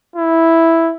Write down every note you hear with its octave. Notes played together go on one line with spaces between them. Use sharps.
E4